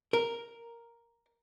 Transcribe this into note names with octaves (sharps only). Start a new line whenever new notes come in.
A#4